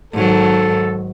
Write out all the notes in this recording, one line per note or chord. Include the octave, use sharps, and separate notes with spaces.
G#2 D#3 F#3 A4